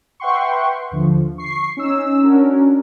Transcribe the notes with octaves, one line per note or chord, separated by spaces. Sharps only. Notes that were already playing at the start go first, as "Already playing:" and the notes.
B4 E5 F#5 G5 C6 C#6
D#2 D3 F3
C#6 C7
C#4 D#4 E6
C#4 D4 F#4 A#4